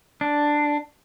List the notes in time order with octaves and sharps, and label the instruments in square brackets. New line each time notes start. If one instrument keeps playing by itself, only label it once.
[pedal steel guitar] D4